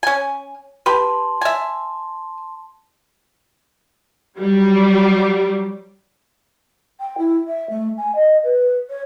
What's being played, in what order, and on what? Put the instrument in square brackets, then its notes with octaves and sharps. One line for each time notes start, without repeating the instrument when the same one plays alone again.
[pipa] C#4 G#5
[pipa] G4 B4 [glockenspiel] A5 C6
[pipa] E5 G#5
[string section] F#3 G3
[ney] G5
E4
E5
A3
G#5
D#5
B4
C#5